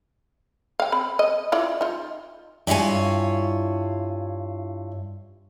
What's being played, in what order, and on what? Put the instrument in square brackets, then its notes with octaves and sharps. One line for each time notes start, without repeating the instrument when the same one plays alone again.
[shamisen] F5 G5
C4 B5
D#5
E4 F4 D5
D#4 F4
[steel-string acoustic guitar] G2 E4 F4 C#5 G#5